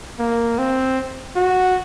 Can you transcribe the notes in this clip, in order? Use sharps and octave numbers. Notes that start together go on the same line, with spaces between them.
A#3
C4
F#4